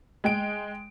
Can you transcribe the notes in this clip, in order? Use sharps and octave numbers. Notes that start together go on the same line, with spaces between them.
G#3 G5 D7